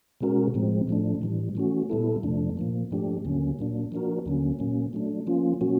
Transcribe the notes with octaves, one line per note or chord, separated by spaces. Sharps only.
B2 G#3 C#4 F#4 A#4
A2 F3 G#3 C4
A2 F3 A3 D4
A2 E3 G3
E3 A3 C#4 F#4
A#2 G3 B3 E4 A4
F2 C3 F3 A3 D4
A#2 F3 A#3
G#2 F3 A3 D4 G4
D#2 D3 F#3 A#3 C#4
A#2 F#3 A#3 D4
F3 A#3 D4 F#4 A#4
D#2 D3 F#3 A#3 C#4
A#2 F#3 A#3 C#4
F#3 A3 D4
F3 A#3 C#4 F4
B2 F#3 A#3 C#4 F#4